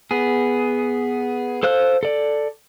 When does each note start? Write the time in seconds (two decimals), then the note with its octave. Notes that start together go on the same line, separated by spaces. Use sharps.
0.11 B3 G#4
1.63 A4 C5 F5 F#6
2.03 A4 D5